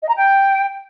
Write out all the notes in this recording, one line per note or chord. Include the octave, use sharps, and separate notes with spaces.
D#5
A#5
G5